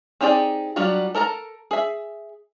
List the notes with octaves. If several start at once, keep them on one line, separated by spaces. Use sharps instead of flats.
C4 D#4 G4 G#4 D5
F#3 G3 D4 F4 F#4
A4 A#4 A5 A#5
G#4 E5